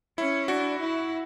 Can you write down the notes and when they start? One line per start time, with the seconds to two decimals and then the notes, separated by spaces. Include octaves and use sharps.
0.18 C#4 E4
0.48 D4 F#4
0.79 E4